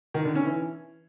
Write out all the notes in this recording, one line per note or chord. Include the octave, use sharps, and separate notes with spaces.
D#3
D3
C#4
E3